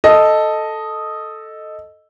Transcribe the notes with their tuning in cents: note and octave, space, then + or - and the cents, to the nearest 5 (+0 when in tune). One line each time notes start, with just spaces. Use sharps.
A4 +0 D#5 +0